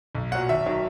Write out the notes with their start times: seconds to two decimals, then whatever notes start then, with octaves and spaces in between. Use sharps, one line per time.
0.15 B1
0.31 A#2 F#5
0.35 F#3
0.49 G#1 E5
0.66 D#3 F#3